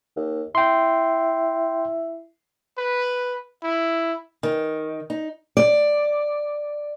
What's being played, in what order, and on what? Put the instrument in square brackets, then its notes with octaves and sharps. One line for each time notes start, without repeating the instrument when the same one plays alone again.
[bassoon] D#2
[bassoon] E4 [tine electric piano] G5 C6
[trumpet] B4
E4
[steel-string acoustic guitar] D#3
D#4
D5